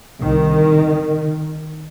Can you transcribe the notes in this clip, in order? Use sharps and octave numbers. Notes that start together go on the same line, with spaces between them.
C2 C3 D#3